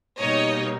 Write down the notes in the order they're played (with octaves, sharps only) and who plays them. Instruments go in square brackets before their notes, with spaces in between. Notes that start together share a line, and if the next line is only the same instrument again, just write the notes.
[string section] B2 G3 A#3 D#4 C#5 D#5